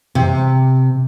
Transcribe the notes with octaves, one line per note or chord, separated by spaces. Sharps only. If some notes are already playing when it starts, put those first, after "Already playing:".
C3